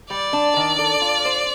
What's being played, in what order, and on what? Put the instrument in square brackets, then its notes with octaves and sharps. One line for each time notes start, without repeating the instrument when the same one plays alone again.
[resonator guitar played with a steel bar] G3 [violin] D5
[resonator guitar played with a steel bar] D4
D#3
A4
F4
C5